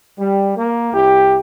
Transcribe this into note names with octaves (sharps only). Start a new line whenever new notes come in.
G3
A#3
C2 E4 G4